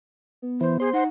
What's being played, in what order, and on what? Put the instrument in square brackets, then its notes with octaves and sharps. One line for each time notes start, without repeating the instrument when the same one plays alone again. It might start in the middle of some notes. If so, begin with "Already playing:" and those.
[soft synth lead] B3
[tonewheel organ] E3 [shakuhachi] C5
[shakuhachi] G#4 [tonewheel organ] C5
[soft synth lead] D#4 [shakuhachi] F#5